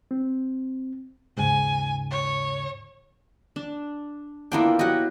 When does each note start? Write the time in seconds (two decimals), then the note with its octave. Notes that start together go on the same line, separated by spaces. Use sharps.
0.11 C4
1.37 D#2 G#2 C#3 G#5
2.11 C#5
3.56 D4
4.52 A#3 B3 D4 E4 F4 G5
4.79 F#3 G4 D#5 F#5